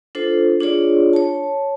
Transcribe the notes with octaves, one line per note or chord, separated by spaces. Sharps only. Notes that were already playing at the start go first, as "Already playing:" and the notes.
D4 F4 A4 C5
D4 F4 G#4 C#5 D5
C#5 A5